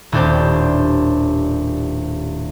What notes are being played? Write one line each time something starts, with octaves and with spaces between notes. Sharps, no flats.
D#1 A2 D4 G4 C5